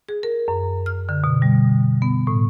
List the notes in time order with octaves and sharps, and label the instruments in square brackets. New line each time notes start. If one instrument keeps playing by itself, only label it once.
[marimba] G#4
A#4
F#2
F6
D3
B2
G3
B3
A2